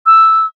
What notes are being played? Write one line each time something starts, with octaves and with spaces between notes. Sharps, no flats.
E6